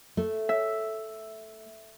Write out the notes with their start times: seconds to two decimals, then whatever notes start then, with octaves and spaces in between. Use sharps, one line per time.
0.17 A3
0.49 E5